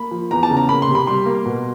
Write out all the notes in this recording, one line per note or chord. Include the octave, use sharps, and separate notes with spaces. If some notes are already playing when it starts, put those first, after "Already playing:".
Already playing: A#3 B5
F3
E2 A#5
A5
C#3
A#5
A#3 B5
C6
C3
B5
G3 C6
A#3
B2